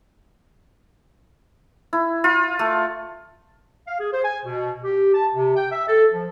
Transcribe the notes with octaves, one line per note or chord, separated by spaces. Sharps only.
E4
F4
A3
F5
G#4
C5
G#5
B2
G4
A5
C3
G5
E5
A4
F3